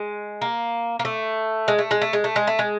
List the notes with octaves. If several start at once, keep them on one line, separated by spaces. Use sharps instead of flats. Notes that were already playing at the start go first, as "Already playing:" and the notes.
Already playing: G#3
A#3
A#3
A3
G#3
A3
G#3
A3
G#3
A3
G#3
A3
G#3